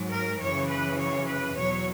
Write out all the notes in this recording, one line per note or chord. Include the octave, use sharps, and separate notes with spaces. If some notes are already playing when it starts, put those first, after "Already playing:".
Already playing: G#2 F#3
A#4
F#2 C#3 E3 C#5
B4
C#5
B4
E2 B2 F#3 C#5